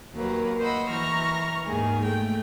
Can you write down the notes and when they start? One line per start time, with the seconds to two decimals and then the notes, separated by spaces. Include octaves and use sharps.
0.14 D#2 F#3 A#3 B4
0.60 C5 D#5 F#5 B5 E6
0.89 E3 A#5 C#6 F6 A#6
1.66 D#2 G#2 D#3 G#4
2.03 A3 G5